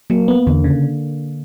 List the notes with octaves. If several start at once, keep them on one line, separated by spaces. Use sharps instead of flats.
F#3 A#3
B3
E2 D3
C#3